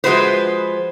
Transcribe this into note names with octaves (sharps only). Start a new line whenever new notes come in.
F3 G#3 E4 F#4 B4 C5